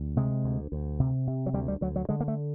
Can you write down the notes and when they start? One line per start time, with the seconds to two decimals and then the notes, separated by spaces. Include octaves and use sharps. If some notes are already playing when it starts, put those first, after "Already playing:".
Already playing: D2
0.17 C3 G#3
0.44 D2
0.72 D2
1.00 C3
1.27 C3
1.46 F#3
1.53 D2 G3
1.68 G3
1.81 D2 F#3
1.96 F#3
2.09 D3 G#3
2.20 A#3
2.28 A3